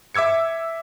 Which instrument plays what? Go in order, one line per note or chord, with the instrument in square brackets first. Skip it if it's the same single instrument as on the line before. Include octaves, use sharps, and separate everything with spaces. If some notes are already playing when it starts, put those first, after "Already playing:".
[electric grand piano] E5 D6 E6 G#6 C#7